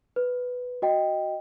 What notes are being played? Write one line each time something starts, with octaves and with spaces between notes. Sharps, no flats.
B4
F#4 D#5 G5